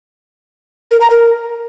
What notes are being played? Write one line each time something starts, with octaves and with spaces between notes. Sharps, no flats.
A#4
A#5
A#4